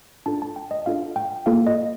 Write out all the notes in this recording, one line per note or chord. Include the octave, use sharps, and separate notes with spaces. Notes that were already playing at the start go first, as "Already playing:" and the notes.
D4 F4 A4 A5
A5
G5
D#5
D4 F4 A4 F5
G5
A#3 F4 A4 F5
D#5